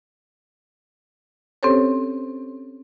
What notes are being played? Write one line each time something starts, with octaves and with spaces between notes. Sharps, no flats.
C4 C#4 G4 A4 C5 C#5